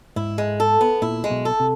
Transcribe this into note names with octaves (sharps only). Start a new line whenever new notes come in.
G#2 E4
G#3
A4
B3
A#2 E4
G#3
B1 B2
A4
C3